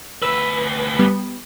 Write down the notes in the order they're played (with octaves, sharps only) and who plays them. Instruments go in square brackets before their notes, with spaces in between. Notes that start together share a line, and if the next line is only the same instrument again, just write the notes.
[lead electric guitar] D2 B4 [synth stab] E6
[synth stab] G3 B3